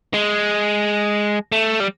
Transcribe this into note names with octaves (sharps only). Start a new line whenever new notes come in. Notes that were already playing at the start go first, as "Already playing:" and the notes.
G#3
A3
G3